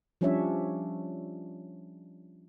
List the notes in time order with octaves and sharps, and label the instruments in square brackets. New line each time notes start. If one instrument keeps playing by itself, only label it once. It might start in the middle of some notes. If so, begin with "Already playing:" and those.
[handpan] F3 G3 C#4 D4 C#5 E5